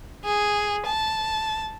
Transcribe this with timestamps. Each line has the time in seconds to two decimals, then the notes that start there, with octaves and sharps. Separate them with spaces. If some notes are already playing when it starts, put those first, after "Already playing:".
0.25 G#4
0.86 A5